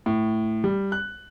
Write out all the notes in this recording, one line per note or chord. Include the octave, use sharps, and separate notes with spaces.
A2
G3
F#6